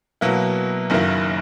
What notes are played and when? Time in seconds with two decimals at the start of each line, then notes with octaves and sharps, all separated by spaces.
0.21 B2 F#3 A#3 E4
0.90 F#1 F#2 D#3 A#3 E4